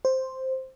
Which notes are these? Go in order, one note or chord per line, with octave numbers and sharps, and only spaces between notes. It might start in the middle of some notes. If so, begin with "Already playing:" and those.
C5